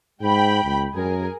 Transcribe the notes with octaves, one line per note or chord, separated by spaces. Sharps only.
G#2 G#3 G5 B5
C#2
F#2 G#4 A#4